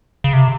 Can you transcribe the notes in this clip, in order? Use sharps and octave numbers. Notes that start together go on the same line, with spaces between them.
C#3
C3